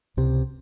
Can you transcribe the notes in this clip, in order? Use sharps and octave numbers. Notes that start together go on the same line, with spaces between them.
C#2 C3